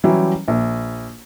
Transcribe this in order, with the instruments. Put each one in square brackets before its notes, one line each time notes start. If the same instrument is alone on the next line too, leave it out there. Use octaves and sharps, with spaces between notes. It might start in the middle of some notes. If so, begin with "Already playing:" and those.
[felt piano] E3 F#3 G3 C#4 E4 G4
A#1